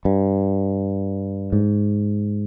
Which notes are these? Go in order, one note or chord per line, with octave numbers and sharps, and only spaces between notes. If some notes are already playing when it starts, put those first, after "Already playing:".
G2
G#2